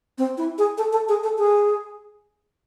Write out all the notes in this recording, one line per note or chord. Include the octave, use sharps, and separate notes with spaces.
C4
E4
G#4
A4
A4
G#4
A4
G#4